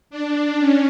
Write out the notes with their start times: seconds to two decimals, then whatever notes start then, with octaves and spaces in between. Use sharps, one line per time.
0.10 D4
0.60 C#4